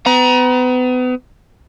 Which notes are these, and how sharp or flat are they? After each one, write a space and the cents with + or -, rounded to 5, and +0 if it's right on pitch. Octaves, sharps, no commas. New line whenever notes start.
B3 +35 A#5 +35